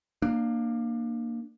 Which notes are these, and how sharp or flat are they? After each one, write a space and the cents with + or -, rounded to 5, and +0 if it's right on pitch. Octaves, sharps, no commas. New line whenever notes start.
A#3 +0 D4 +25